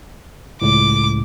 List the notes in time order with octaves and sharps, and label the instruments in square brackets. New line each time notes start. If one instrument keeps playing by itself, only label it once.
[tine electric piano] C#2 A2 [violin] D6